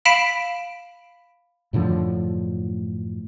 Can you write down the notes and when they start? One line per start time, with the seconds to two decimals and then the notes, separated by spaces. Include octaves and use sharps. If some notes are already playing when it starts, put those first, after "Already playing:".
0.05 F5 B5 B6 D7 E7
1.73 F#2 A2 D3 F3